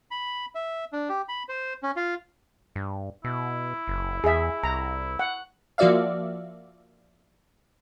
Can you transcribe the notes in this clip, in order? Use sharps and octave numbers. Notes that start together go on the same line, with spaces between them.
B5
E5
D4
G4
B5
C5
C#4
F4
G2
B2 E4
F#1
E2 G#4 E5
C2 A#5
F#5
F3 A#3 F#4 D5 E5 F5